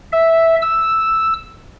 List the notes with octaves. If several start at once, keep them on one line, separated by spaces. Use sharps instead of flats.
E5
E6